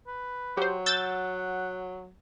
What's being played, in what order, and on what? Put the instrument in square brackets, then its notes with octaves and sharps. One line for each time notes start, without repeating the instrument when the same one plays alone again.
[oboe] B4
[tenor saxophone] F#3 [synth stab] G4 C5
[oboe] F#5 [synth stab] E6 G6 A6